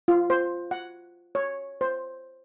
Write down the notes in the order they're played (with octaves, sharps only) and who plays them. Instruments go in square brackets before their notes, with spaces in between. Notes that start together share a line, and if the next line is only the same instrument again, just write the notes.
[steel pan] F4
C5
F#5
C#5
C5